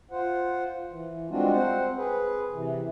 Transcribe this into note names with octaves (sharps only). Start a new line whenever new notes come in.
F4 C5 F#5
E3
G3 G#3 C4 D4 F4 F#4
C4 C5 F#5
G#4 B4
C3 E3